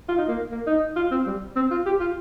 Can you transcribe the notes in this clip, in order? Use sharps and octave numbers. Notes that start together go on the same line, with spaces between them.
F4
D#4
A#3
A#3
D#4
F4
C4
G3
C4
F4
G4
F4